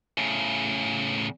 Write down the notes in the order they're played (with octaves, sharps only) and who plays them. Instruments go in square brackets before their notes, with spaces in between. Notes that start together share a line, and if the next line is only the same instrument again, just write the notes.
[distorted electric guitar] A2 C#3